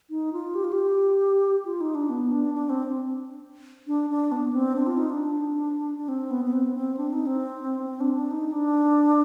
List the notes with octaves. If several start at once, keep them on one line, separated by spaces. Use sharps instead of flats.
D#4
F4
G4
F4
G4
F4
D#4
D4
B3
D4
D4
C4
D4
D4
B3
C4
D4
F4
D#4
D4
D4
C4
B3
B3
C4
C4
D4
D#4
C4
C4
D4
D4
D#4
D4